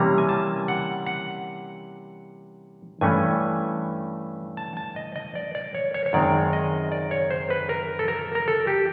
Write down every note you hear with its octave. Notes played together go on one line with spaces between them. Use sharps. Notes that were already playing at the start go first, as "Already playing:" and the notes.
Already playing: C3 E3 G3 A#3 C#4 A#5
G#5
A5
F#5
F#5
G2 E3 A3 C#4 G#5
A5
A5
D#5
D#5
D5
D5
C#5
C#5
C#5
F#2 D#3 G#3 C4 D5
D#5
D5
C#5
C5
B4
A#4
A4
A#4
A#4
A4
G4